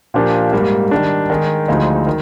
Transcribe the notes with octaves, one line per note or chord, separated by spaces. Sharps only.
A#2 F3 A#3 D4 G4
G#2 G3 A#3
D#3 G3 D4
D#3 G#3 D#4 G#4
D2 D3 F3 G#3 D#4
D#3